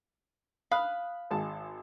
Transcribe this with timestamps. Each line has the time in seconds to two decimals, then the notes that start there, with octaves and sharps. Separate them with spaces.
0.72 F5 B5 D#6 F#6
1.31 G#1 G#3 A5